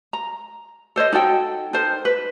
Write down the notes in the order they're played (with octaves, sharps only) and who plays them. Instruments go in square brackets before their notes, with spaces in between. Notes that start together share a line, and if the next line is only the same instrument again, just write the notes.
[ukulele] A#5
A4 C5 C#5 D#5
D#4 F#4 A4 G5
D#4 A4 A#4 C5
B4